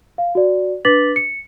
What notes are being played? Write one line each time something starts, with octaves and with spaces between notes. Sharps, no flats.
F5
F#4 D5
D4 B4 D6 A6 B6 F#7
C#7